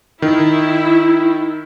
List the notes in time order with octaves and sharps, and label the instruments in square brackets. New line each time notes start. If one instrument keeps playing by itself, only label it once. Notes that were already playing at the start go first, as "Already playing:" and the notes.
[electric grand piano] D#3 [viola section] E4